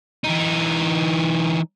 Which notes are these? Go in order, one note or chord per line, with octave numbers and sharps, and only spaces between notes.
E3 D#4